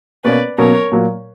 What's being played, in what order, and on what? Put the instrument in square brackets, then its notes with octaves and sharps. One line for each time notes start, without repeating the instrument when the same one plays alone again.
[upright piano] B2 A#3 C#4 [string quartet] B4 D5
[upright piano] B2 F#3 A#3 C#4 [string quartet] A#4 C#5
[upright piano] A#2 F#3 A#3